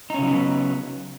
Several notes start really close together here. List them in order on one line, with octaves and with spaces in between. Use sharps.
D#4 C#4 C#3 F#3 B3